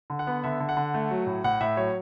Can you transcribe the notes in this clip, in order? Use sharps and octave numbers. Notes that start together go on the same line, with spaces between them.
D3
F#5
B3
D3 E5
D3
F#5
D3
A3
F#3
A2
A2 F#5
A2 E5
F#3 C#5